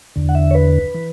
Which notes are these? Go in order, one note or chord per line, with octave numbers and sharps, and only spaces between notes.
E2 D3
F#5
E5
C#5
B4
E3